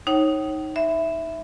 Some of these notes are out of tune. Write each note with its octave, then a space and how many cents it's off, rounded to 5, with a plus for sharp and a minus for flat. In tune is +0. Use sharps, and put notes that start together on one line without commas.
D#4 +5 C#5 -25 G5 -40
E5 +0 B5 +20